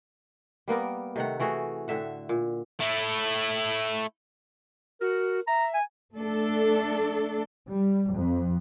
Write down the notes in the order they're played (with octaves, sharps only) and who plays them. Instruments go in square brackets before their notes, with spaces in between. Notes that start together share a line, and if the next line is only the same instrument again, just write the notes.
[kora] G3 A#3 B3 A#4
C3 D#3 A3 F#5
E3 A3 F#4 G#4
A2 D3 E5 F#5
A#2
[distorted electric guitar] A3 E4
[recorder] F#4 [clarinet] A#4
[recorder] E5 [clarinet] A#5
[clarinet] G#5
[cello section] A3 D4 A4
[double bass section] G3
F2